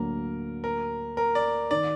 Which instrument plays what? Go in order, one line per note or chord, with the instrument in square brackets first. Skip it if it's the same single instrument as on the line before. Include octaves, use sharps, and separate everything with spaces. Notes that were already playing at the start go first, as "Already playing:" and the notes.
Already playing: [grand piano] D2 D3 F#3 A#3 [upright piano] A#4
[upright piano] A#4
A#4
D5
[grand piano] D#3 [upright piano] D5